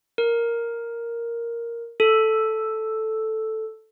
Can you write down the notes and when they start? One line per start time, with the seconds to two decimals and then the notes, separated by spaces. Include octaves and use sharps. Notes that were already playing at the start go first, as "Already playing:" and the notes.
0.18 A#4
2.00 A4